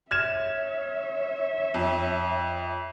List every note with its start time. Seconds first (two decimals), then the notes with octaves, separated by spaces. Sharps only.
0.11 C#5 E5 F6 G#6 E7
1.74 F2